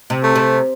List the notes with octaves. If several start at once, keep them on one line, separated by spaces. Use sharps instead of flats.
C3
A3
C3